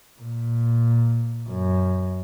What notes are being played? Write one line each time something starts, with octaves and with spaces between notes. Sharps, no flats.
A#2
F#2